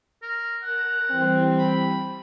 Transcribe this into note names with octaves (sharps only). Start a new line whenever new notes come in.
A#4
A#4 F#5 A5 A#5
E3 G3 C4
B5